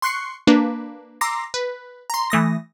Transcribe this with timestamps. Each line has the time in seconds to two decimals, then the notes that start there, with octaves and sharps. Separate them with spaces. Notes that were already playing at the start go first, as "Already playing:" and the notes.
0.02 C6 C#6 F#6 C7 C#7
0.47 A#3 D4 B4
1.21 A#5 C6 D6 E6 A#6 C7
1.54 B4
2.10 A#5 C6
2.30 E3 A3 D#6 A#6